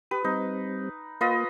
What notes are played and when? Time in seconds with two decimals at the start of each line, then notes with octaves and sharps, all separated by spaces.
0.11 G4 B4 D#6
0.24 G3 C4 D#4
1.21 A#3 F4 B4 D#5